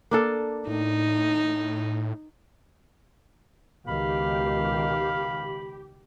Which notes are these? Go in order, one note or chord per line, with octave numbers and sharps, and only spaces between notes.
A#3 D4 A4
A2 D#4
C#2 B2 D#3 G4 F5 B5